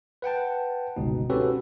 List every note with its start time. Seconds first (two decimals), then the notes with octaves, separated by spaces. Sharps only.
0.22 B4 F#5 G5 A5
0.96 G1 C#2 B2 D#4
1.30 C4 C#4 F#4 G4 A4 B4